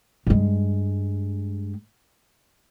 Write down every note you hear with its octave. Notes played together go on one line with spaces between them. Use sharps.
G2 G#3